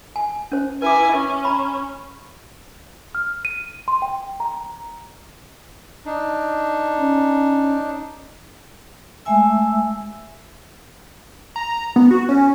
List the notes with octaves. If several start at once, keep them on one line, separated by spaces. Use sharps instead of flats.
G#5
C#4 C5
E4 B4 G#5 D6
C#4
A#5 B5
F6
D#7
C6
G5
A#5
D4 D#4
C#4
G#3 A3 E5 G#5 E6
A#5
B3
F#4
C#4